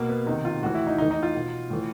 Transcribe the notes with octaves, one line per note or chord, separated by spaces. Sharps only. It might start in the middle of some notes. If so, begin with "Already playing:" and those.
Already playing: B2 A#3
B3
C3 D#3 D#4
F4
A2 E3 F#4
E4
D#4
A2 E3 D#4
D#4
F4
B2
A2 E3